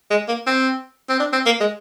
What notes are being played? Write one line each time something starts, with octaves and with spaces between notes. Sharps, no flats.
G#3
A#3
C4
C4
D4
C4
A#3
G#3